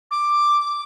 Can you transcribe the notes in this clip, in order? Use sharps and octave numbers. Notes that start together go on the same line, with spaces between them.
D6